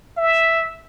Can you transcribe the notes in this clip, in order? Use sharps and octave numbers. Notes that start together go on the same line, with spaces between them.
E5